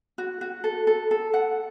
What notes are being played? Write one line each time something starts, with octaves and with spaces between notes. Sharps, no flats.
F#4
F#4
A4
A4
A4
F#5